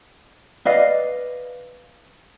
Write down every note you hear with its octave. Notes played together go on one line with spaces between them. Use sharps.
B4 D5 D#5 F5